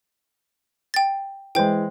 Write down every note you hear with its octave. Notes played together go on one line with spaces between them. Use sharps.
G5 A6
E3 G#3 C5 G5